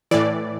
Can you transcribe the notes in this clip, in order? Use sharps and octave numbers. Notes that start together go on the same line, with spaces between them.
A2 E3 D5